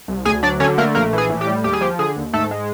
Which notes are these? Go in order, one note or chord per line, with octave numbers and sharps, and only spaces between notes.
C2
D2 G#4 G#5
F#3 D4 D5
D3 C#4 C#5
A3 A#3 A#4
A#1 A#3 A#4
E3
G#4
A2
G4
G3
D#2 G4
G#4
F3 G4
D3 G#4
D#2
G#2 A3 A4
G#3